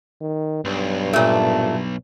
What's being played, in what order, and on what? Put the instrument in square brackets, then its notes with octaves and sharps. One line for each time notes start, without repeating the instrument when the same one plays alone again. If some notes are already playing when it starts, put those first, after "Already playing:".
[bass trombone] D#3
[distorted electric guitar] B1 [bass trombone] G2
[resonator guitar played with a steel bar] A#2 A3